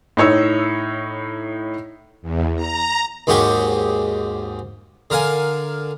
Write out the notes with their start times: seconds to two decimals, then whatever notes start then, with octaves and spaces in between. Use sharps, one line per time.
0.17 A2 D#4 C#5 E6
2.22 E2
2.56 A#5
3.27 D#2 G#2 C#4 F#4 G4 C#6
5.10 D3 A#4 F5 G#5